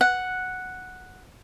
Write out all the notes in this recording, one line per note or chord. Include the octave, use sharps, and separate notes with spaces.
F#5